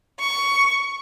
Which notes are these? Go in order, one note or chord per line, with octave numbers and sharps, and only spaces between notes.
C#6